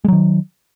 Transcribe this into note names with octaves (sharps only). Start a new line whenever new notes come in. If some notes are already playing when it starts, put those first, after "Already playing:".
D#3 F#3 G#3